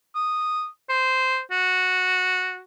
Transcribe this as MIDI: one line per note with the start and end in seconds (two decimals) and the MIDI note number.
0.15 0.66 87
0.89 1.40 72
1.51 2.61 66